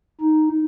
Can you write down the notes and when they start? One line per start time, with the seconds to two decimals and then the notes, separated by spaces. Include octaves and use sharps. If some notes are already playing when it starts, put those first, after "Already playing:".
0.21 D#4